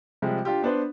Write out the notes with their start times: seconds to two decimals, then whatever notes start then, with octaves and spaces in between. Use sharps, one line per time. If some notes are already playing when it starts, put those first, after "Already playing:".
0.22 C3 F3 G3 G#3
0.45 D4 F4 G4
0.63 B3 D4 B4 C5